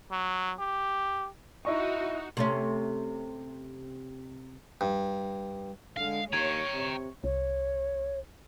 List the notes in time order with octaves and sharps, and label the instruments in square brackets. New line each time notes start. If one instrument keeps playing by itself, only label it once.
[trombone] F#3
G4
[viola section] D#4 F#4 [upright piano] E4 D#5 C#6
[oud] C3 A3 C#4
[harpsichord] G2
[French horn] D3 [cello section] G#3 [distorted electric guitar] F5
[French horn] D#2 [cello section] C#5 [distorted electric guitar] G5 A#5 [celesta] G#6
[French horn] C3
[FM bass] C2 [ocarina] C#5